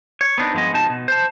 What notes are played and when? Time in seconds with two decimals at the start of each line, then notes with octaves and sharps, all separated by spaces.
0.21 C#5
0.38 B3 C4 D4 D#4
0.53 G2 F3 G#3 B3 D#5
0.72 F2 B2 F3 D#4 A5
0.90 B2
1.08 C5 A5